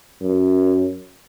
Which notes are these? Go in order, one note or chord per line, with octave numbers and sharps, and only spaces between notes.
F#2